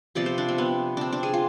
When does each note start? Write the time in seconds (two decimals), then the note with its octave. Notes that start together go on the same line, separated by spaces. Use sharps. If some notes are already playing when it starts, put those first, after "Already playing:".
0.15 C3 F3 B3 D5
0.26 C5
0.38 D4
0.48 C4
0.58 B3
0.97 C4 D4
1.12 D4
1.23 G#4
1.34 F4